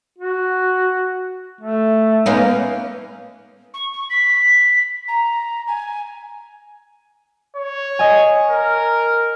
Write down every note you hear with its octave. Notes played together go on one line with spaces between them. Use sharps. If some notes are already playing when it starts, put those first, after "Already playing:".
F#4
A3
A#3 B3 C#4 D#4
C#6
C#6
B6
A#5
G#5
C#5
D#5 G#5
A#4